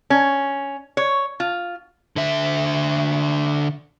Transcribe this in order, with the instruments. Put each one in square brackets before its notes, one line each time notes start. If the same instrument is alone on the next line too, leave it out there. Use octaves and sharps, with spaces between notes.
[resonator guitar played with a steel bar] C#4
C#5
F4
[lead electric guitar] D3 E5